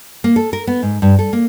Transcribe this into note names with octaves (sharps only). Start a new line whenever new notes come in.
A#3
A4
A#4
B3
G#2
G2
A4
A#3